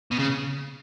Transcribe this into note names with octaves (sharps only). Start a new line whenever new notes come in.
B2
C#3